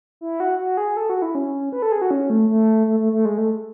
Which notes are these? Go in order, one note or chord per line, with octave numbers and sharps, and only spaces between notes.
E4
F#4
F#4
G#4
A4
F#4
E4
C#4
B4
A4
G#4
F#4
C#4
A3
A3
A3
A3
A3
G#3
A3